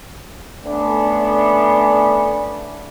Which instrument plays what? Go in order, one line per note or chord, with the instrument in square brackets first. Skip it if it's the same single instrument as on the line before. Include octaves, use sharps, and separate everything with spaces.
[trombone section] D3 A3 B3 C#4 D4